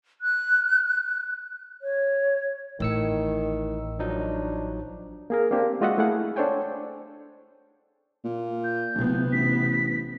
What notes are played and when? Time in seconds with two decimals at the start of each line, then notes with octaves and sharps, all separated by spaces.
0.21 F#6
1.82 C#5
2.80 A1 A2 D#3 E6 C#7
3.99 F3 F#3 D4 D#4
5.30 A#3 G#4 A#4
5.51 A#3 C4 D4 G4
5.81 G#3 F4 F#4 D#5 E5 F#5
5.98 A3 E4 G#4 F5 F#5
6.36 D4 A4 C5 C#5 G5 G#5
8.25 A#2
8.64 G6
8.95 D1 C3 B3
9.33 A1 B6